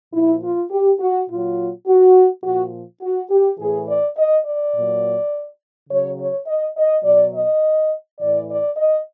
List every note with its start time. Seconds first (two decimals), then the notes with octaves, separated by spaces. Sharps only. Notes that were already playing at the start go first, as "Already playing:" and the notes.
0.13 A#2 F3 E4
0.42 F4
0.71 G4
1.00 F#4
1.29 A#2 F#3 F4
1.87 F#4
2.44 A#2 F3 F#4
3.02 F#4
3.30 G4
3.59 A2 E3 G#4
3.87 D5
4.17 D#5
4.45 D5
4.75 A#2 F#3
5.89 C#3 F#3 C#5
6.18 C#5
6.47 D#5
6.76 D#5
7.04 B2 F#3 D5
7.33 D#5
8.20 A2 E3 D5
8.49 D5
8.77 D#5